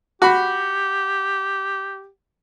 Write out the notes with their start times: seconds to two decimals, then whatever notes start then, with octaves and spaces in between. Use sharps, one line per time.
0.22 F#4 G4 B5